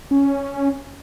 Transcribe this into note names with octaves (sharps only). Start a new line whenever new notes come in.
C#4